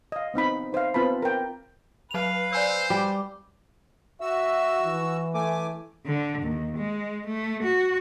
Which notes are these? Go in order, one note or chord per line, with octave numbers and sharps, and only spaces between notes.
D#5 F5
B3 C4 D#4 B5
D#4 C5 E5 F5
B3 C4 F4 B4 A5 B5
A#4 G5
F#3 B4 F5 F7
C5 D5 G#5 E6
G3 D6
F#4 E5 E6
E3
A3 G#5 D6
D3
D#2
G#3
A3
F#4